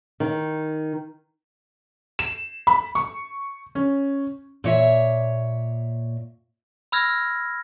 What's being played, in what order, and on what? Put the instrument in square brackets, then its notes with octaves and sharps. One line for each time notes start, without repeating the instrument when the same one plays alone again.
[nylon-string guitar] D#3
[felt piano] E7
B5
C#6
C#4
[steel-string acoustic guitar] A#2 C#5 E5
[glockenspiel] B5 E6 F6 G#6 A#6